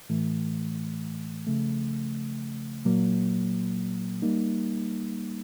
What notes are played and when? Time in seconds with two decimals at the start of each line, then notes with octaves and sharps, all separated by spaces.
0.09 A2 E3 A3
1.47 C#3 F3 A3
2.85 A#2 F#3 A#3
4.22 G3 A#3 D#4